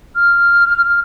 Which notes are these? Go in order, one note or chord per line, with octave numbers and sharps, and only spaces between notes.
F6